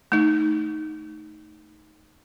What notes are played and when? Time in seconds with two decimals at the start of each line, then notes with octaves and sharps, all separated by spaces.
0.12 A3 D#4